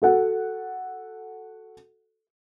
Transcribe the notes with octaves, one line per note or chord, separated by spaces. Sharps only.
F#4 A4 F#5